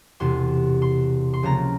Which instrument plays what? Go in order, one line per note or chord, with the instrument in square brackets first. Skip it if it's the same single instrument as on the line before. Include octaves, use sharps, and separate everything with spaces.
[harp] E1 E2 C3 C6
C6
C6
C#2 C#3 F3 A#3 A#5